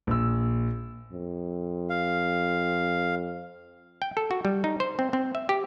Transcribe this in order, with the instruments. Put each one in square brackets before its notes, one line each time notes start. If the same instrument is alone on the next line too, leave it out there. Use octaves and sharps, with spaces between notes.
[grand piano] A#1 E6
[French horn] F2
[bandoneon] F5
[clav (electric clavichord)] G5
A4
F#4
G3
D#4
C5
C4
C4
E5
G4